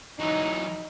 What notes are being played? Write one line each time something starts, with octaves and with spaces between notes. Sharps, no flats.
E3 F#3 D#4